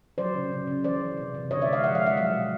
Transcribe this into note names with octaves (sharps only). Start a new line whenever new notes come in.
F#3 C5 D5
C#3
C#3
C#3
E3 C5 D5
E3
C3
C3
D3 C#5 D#5
D5 E5
G#3
D#5 F5
F3 E5 F#5
D#5 F5
G#3
E5 F#5
F#3 D#5 F5
B2